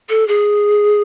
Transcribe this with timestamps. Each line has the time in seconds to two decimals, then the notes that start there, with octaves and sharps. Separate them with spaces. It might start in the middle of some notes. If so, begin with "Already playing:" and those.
0.09 A4
0.28 G#4